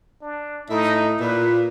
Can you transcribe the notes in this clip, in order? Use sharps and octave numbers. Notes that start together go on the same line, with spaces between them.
D4
A2 D#4 E5
A#2 B4